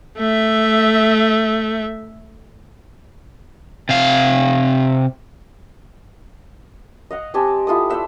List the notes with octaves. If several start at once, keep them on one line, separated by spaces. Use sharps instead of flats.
A3 E5
C3 F5
D#5 F5 F#5
C4 G4 G#5 A5
E4 F4 A4 D#6
C5 D5 E5 F#5